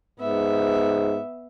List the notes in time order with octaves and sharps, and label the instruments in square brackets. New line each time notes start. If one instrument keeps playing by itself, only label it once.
[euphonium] G#2 [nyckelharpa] B3 E5